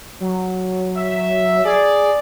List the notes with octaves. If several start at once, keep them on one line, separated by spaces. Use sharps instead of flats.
F#3
E5
G#4 D5